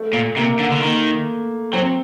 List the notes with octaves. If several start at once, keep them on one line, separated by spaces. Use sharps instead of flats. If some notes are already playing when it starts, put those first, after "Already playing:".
Already playing: A3
A#2
C3 A#3
D3
D3
D#3 A#3
F#3 C4